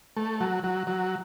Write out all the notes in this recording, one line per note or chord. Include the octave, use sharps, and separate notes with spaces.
A3
F#3
F#3
F#3